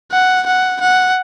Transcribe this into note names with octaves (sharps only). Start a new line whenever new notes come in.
F#5
F#5
F#5